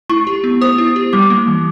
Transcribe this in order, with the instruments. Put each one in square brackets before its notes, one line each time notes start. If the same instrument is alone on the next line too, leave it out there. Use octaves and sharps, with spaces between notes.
[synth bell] E4 [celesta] C#6
[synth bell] G4
B3
[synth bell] C5 [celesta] D#6
[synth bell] E4
G4
[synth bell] G3 [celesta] D6
[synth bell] A#3
E3